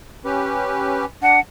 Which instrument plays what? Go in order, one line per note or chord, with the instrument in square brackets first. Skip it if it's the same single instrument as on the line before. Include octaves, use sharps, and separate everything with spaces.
[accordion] C#4 G4 B4
[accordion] D4 [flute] F#5